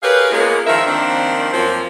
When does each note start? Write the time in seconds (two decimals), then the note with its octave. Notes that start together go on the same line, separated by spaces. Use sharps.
0.03 G4 G#4 A#4 B4 C#5 F5
0.31 G#3 A#3 B3 C#4 F4 G#4
0.67 D#3 F3 A#4 E5
0.86 D#3 F3 A#3 C4 D4
1.52 F#2 F3 A#3 C4